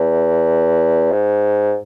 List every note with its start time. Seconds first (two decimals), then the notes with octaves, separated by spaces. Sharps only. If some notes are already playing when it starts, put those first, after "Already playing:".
Already playing: E2
1.12 G#2